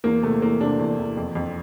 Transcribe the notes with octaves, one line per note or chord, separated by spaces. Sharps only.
E2 A#3
C3 A3
E2 A#3
C3 D4
E2
E2
F2
F2